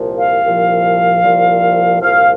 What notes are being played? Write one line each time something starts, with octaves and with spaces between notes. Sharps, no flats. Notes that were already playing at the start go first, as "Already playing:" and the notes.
Already playing: C2 A#2 F3
F5
C2 A#2 F3
C2 A#2 F3
C2 A#2 F3 F5